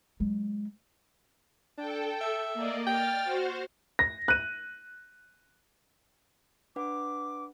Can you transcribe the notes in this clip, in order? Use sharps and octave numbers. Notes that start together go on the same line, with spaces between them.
F#3 G#3
D4 A4 G5
E5
A#3 D5 D#5
G5 F6 A6
F#4 C5
A#6
F#6 D#7
D4 B4 F#5 D6